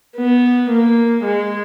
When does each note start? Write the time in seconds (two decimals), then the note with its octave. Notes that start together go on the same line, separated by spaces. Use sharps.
0.17 B3
0.70 A#3
1.24 G#3